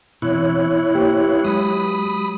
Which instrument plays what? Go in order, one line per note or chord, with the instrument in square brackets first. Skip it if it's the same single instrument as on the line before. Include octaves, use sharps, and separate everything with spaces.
[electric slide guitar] B2 E3 C4 [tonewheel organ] E4 C#5 F#6
[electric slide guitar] A#3 C5 [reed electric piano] G4
[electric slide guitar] B4 F5
[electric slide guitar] F#3 G#3 [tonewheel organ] B5 D#6